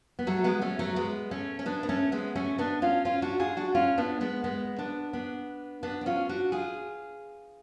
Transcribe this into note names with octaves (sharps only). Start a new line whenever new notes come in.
B3
F#3 A3
G#3 B3
A3 C#4
F#3 A3
G#3 B3
A3 C#4
C#4
B3 D4
B3
A3 C#4
G#3 B3
A3 C#4
B3 D4
C#4 F4
C#4 F4
D4 F#4
F4 G#4
D4 F#4
C#4 F4
B3 D4
G#3 B3
G#3 B3
B3 D4
B3 D4
B3 D4
D4
C#4 F4
D4 F#4
F4 G#4